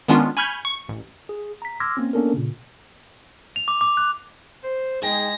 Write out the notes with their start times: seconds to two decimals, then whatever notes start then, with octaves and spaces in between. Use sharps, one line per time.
0.08 D#3 G#3 B3 C#4 D4 F4
0.37 G#5 B5 C#6 F6 G6 G#6
0.65 C#6
0.89 A1
1.29 G#4
1.62 A#5 B6
1.80 C6 D6 E6 F6 G#6 A#6
1.97 A#3 C4 C#4
2.13 A#3 B3 C#4 D4 A4 A#4
2.34 A#2 C#3
3.56 F7
3.68 D6
3.81 D6
3.97 F#6
4.64 C5
5.02 G#3 D#4 G#4 G5 A#6